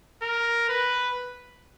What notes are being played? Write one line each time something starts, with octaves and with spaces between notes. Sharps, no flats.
A#4
B4